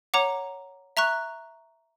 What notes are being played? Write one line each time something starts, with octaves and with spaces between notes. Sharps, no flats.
C#5 F#5 A#5 D6
E5 A#5 C#6 F#6